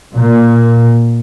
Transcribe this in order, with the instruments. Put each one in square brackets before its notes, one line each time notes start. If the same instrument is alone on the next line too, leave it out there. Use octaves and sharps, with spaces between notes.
[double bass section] A#2